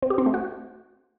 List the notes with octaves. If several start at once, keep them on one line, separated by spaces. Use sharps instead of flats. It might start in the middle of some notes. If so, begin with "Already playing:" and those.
C4
G4
C4
A3
F#4